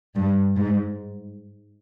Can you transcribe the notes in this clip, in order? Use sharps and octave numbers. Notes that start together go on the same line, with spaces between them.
G2
G#2